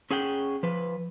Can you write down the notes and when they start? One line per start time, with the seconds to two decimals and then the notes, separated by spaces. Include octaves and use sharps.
0.11 C#4 G#4 F#5 G5
0.63 F3 B4